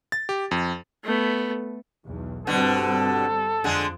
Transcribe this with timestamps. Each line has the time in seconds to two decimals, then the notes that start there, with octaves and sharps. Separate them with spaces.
0.12 A6
0.29 G4
0.51 F2
1.04 A3 B3
2.05 B1 E2
2.47 G1 B2 D3 G3 C4 A4
3.64 F2 D3 G#3 G#4